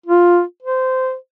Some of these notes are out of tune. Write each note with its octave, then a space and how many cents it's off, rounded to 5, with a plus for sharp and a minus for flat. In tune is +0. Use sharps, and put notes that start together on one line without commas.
F4 +5
C5 -15